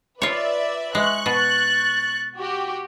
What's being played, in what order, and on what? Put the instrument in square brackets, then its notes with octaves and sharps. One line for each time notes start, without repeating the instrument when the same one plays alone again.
[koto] F4 C#5 [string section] B4 D5 E5
[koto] G#3 [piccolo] E5 [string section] C#6 F#6
[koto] B2 [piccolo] A6
[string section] F#4 G4